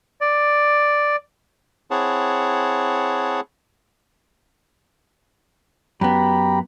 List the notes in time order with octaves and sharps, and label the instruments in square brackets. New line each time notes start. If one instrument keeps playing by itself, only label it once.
[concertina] D5
C4 E4 G#4 C#5 F#5 A5
[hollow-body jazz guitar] F#2 B3 [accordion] G4 A#5 B5